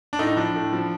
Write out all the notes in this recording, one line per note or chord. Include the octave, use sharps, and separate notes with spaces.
D4
A2 D#4
F3 D4
A2
F3